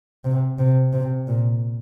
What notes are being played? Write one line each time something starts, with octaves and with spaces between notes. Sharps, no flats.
C3
C3
C3
A#2